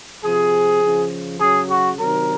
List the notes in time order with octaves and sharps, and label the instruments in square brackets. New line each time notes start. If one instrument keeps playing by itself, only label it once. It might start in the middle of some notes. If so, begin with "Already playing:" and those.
[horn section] C3 F3 G#4
C#3 F3
C#3 F#3 G#4
F#4
C3 D#3 F#3 A#4